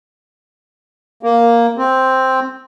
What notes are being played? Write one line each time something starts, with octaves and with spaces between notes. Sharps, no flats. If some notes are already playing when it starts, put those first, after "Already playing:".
A#3
C4